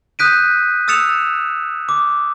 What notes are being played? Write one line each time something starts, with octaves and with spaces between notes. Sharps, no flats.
D#6 F#6 G6 B6 D7 D#7
D#6 E6 A6 C#7 E7 F7
D6